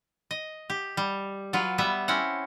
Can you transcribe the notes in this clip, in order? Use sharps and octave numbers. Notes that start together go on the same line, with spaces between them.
D#5
G4
G3
F#3 F4 B4
G3 B3 B4 E5
C4 C#4 E4 F#5